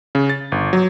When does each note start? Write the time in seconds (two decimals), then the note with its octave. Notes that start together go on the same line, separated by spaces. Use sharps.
0.15 C#3
0.30 A6
0.52 G1
0.73 F#3